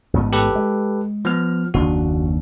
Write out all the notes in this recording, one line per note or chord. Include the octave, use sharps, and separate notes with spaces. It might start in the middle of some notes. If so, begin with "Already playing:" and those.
A1 G#2 B3
G4 A4 B4
G#3
F3 B3 F6
F#1 D#2 D4 F#4